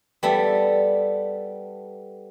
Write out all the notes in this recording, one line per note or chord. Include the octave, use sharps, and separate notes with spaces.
G3 B3 A4 E5